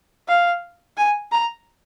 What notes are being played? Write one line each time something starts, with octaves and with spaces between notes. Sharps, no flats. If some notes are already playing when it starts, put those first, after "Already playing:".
F5
G#5
A#5